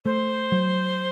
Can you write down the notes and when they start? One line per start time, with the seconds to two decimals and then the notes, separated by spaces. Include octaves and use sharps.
0.05 A3 C5
0.52 F#3